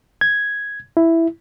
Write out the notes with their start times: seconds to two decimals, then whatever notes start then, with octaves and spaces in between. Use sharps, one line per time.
0.21 G#6
0.97 E4